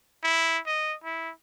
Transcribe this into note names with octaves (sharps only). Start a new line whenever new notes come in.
E4
D#5
E4